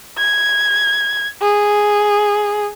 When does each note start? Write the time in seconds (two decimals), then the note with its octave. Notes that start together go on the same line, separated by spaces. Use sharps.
0.17 G#6
1.41 G#4